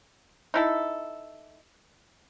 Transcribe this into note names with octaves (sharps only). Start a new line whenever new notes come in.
D#4 E4 A4